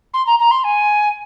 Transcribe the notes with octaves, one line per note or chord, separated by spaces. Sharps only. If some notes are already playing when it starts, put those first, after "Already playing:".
C6
A#5
A#5
C6
G#5